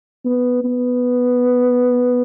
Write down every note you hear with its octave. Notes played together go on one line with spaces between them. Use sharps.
B3
B3